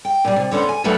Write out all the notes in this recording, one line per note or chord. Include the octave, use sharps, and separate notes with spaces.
G5
A#2 G3
C3
D3 B3 C#4 C5
G#5
D2 F#3 A3 A#3 B4 E5